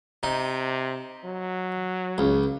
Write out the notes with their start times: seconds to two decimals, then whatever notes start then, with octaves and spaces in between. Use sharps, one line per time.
0.23 C3 D#4
1.24 F#3
2.18 C#2